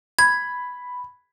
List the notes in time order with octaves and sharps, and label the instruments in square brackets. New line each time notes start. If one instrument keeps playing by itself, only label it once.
[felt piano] B5 [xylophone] G#6